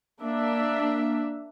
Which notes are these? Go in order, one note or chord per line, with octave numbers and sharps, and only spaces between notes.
A#3 D4 E5